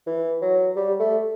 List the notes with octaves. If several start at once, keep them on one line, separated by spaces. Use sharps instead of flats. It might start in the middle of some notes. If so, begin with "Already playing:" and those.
E3
F#3
G3
A3